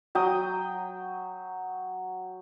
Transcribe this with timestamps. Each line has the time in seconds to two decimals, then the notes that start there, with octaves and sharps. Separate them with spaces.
0.15 F#3 G5 D#6